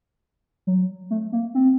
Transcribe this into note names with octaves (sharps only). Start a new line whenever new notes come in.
F#3
A3
A#3
C4